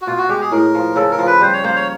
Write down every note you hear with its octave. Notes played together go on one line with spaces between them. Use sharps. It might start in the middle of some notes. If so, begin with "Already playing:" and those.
F#4
B2 F4
F#4
G#3 G4
G#4
A2 A#4
F3
C#3 A4
A#4
F3
B4
G3 C5
C#5
A#3 C5
C#5